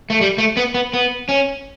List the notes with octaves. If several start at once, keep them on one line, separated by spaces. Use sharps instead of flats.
A3
G3
A3
B3
B3
B3
C#4